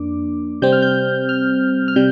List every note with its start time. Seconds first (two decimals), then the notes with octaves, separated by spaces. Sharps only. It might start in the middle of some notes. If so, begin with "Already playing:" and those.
Already playing: F2 A#3 D4 D6
0.62 C3 G3 C4 G6
0.72 F6
0.82 G6
1.29 F6
1.88 F6
1.96 C3 G3 G6